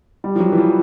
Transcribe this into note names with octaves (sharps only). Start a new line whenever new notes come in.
G3
F3
F#3
E3
F3